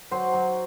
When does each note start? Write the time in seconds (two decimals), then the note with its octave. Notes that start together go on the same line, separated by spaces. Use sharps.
0.11 F#3 C5
0.34 F#3